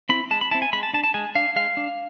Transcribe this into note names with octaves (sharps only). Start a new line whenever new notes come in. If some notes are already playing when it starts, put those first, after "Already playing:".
C4 E4 B5
G#3 A5
B5
C4 E4 A5
G#5
G#3 B5
A5
D4 A5
A5
G#3 G#5
D4 F5
G#3 F5
D4